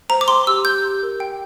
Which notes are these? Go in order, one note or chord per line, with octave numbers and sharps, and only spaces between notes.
C5 A#5
D6
G5 C6
G4 E6
G4 G6
G4
A#4
G5